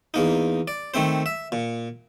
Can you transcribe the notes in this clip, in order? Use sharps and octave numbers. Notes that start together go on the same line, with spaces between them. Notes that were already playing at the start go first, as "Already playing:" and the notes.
E2 A#3 D#4
D5
D#3 A3 C4 C5
E5
A#2